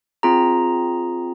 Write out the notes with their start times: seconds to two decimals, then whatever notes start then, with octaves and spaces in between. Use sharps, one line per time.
0.23 C4 F4 G#4 A#5